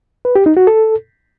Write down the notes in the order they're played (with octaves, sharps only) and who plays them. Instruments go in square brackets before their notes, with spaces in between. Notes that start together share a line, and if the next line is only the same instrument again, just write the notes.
[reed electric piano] B4
G4
D#4
F#4
A4